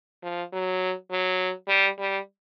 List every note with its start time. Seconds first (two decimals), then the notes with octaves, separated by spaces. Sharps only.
0.23 F3
0.53 F#3
1.11 F#3
1.68 G3
1.98 G3